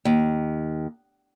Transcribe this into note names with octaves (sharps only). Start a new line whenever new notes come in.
D#2